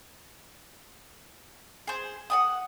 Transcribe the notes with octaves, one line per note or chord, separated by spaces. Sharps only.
G#4 C5
F#5 G#5 D#6